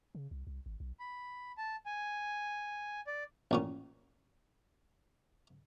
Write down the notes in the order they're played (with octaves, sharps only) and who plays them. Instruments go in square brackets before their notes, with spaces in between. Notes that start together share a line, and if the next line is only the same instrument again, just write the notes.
[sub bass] C#3
C2
C2
G#1
B1
[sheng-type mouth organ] B5
A5
G#5
D5
[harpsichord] A1 A#2 C#4